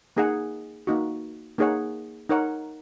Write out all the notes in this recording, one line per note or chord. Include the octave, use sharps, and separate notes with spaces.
A#3 D#4 G#4 F#5
A#3 D#4 F#4
A#3 D#4 G#4 C#5 F#5
D#4 A#4 C#5 F#5